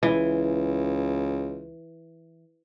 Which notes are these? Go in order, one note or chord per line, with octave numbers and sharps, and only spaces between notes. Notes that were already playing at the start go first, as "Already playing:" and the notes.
C#2 E3